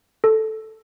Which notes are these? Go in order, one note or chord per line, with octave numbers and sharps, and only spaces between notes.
A4